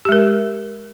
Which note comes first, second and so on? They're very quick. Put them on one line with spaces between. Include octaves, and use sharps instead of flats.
G4 G#3 A#4